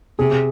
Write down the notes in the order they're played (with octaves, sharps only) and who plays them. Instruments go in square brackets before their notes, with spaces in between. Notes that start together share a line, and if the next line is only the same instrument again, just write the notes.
[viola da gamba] C3 [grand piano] G#4